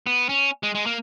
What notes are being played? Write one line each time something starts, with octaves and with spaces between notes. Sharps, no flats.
B3
C#4
G#3
G#3
A#3